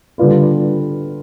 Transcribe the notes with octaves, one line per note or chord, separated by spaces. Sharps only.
D3 G3 D4 F4 B4